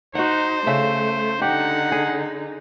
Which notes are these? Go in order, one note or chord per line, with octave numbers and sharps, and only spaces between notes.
D#4 F#4 C5 F#5
C#3 A3 E5
D3 D#4 G4 F#5
G#4